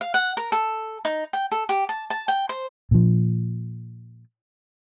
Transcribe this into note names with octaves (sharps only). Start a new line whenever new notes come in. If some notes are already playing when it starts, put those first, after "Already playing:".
F5
F#5
A#4
A4
D#4
G5
A4
G4
A5
A5
G5
C5
A#2 F3